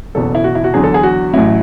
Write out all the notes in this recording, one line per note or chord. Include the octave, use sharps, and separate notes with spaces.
F#1 E2 B2 A4
E4
F#4
E4
F#4
E2 D3 F#3 G#4
A4
G#4
F#4
A1 A2 F#3 E4